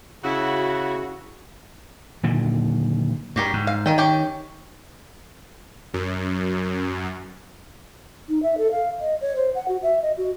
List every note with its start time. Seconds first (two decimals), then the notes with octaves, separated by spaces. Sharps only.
0.23 C#3 E4 F#4
2.23 A#2 D3 D#3 F#3
3.36 G2 F#4 G4 A#4
3.53 G#2
3.67 F5
3.86 D#3 A#4 D#5 G5
3.98 C#4 G4 G5
5.94 F#2
8.29 D#4
8.43 E5
8.58 A4
8.71 F5
9.01 D#5
9.21 C#5
9.36 C5
9.55 F#5
9.68 F#4
9.83 E5
10.02 D#5
10.17 F#4